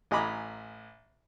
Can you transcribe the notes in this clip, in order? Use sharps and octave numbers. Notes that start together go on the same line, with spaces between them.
A1 D#5 G#5 A#5 B5 D6